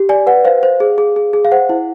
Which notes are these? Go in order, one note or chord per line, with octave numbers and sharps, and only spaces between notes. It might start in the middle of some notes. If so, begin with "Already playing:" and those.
Already playing: G4
D5 G#5
B4 F#5
C5 F5
C5
G#4
G#4
G#4
G#4
F5
C5 F#5
E4